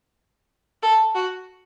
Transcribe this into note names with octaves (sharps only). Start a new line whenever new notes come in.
A4
F#4